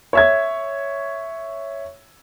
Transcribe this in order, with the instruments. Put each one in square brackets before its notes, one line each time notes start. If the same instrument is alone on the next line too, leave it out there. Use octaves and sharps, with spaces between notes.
[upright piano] C#5 E5 G#6